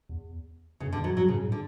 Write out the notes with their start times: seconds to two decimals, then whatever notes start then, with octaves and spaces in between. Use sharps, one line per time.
0.09 E2
0.80 F#2 C#3
0.93 D3
0.97 F#2
1.04 F#3
1.12 G#2
1.17 F#3
1.28 G#2 C#3
1.44 A2
1.52 D3